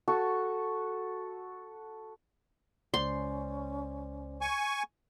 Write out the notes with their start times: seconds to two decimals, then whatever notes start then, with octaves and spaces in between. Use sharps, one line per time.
0.08 F#4 A4
2.94 C#2 C#4 C5 D5 C6
4.41 G#5 C#6